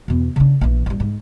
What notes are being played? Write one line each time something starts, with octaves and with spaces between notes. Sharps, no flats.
E2 B2
C#3 D4
A#1 E3
A1 G3
G#2